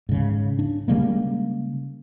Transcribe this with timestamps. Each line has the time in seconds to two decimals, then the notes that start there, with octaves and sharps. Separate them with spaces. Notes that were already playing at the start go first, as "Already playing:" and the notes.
0.09 G#2 C#3
0.59 D4
0.88 C#3 G3 G#3 A#3